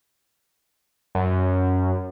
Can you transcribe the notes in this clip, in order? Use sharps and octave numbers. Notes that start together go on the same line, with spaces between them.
F#2